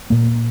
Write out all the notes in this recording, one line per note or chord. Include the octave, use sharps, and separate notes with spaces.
A#2 A#3